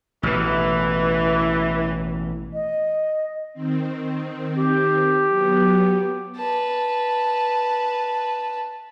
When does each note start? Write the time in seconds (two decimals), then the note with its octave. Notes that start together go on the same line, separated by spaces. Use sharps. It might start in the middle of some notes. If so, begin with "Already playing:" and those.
0.23 A1 B2 E3
2.54 D#5
3.54 D#3 C4
4.59 G4
5.29 F#3 B3
6.36 B4 A5